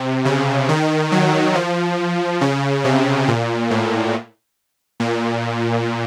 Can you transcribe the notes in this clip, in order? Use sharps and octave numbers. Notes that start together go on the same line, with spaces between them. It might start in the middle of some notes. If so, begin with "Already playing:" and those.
Already playing: C3
C#3
D#3
F#3
F3
C#3
C3
A#2
A2
A#2